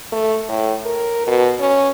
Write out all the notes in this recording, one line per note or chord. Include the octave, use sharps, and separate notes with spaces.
A3
A2
A#4
B2
C#4